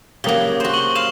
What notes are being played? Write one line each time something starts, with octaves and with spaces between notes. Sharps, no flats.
C#3 F#3 A#3 G4 D#6 G7
F#4 C5
C#6 F#7 G7
F5 E7